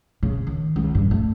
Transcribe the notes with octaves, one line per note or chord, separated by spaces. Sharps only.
C#3
D#3
C#2
G2
A3